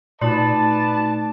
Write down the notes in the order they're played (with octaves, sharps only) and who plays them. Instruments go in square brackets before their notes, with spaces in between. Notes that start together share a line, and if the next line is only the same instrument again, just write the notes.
[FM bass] A#2 [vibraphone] A3 D#4 F#4 [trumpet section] B4 D5 A5